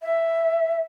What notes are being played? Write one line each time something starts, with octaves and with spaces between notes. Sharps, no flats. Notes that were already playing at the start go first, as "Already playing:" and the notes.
E5